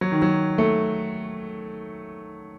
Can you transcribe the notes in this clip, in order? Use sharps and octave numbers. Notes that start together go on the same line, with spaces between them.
F#3
D#3
F#3
A3